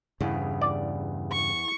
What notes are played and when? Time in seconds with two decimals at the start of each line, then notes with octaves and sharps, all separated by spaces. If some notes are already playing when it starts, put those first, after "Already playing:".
0.21 E2 G2 C#3
0.62 D5
1.32 C#6